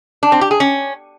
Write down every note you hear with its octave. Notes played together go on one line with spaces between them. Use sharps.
D4
C4
G4
G#4
C#4